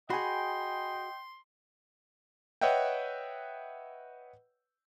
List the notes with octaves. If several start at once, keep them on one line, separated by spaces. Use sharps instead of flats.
F#4 G#4 D#5 G5 G#5 B5 C6
B4 C#5 D#5 E5 F#5 G5